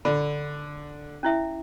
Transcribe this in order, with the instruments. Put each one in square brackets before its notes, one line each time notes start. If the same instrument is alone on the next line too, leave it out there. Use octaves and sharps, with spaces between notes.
[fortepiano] D3 [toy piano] B5
[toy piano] C#4 E4 E5